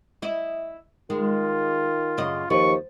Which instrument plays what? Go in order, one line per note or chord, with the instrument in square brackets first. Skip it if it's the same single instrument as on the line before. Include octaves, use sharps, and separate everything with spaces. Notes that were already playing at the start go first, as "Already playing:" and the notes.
[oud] E4 D#5
[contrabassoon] D#3 [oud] G#3 [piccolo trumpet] F4
[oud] F#2 C#3 D#5
[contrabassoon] D#2 [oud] F3 [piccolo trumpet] C#6